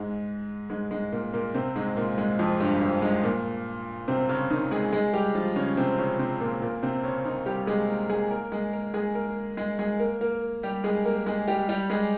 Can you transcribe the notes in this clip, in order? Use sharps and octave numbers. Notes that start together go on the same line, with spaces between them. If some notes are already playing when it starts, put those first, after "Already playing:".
Already playing: G#2 G#3
G#2 G#3
G#2 G#3
A#2 A#3
A#2 A#3
C3 C4
G#2 G#3
A#2 A#3
G#2 G#3
F2 F3
G2 G3
F2 F3
G#2 G#3
A#2 A#3
C3 C4
C#3 C#4
D#3 D#4
G#3 G#4
G#3 G#4
G3 G4
F3 F4
C#3 C#4
C3 C4
C#3 C#4
C3 C4
A#2 A#3
A#2 A#3
C3 C4
C#3 C#4
D#3 D#4
G3 G4
G#3 G#4
A#3 A#4
G#3 G#4
A#3 A#4
G#3 G#4
A#3 A#4
G#3 G#4
A#3 A#4
G#3 G#4
G#3 G#4
A#3 A#4
A#3 A#4
G3 G4
G#3 G#4
A#3 A#4
G#3 G#4
G3 G4
G3 G4
G#3 G#4